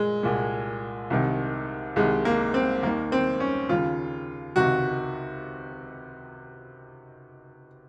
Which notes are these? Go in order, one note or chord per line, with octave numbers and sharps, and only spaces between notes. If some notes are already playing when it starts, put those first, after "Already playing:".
Already playing: A#2 G#3
C2 A#2
C2 C3 D#3
C2 C3 D#3 G#3
A#3
C4
D#2 D#3 A#3
C4
C#4
D#2 C#3 F4
C#2 C3 D#3 F#4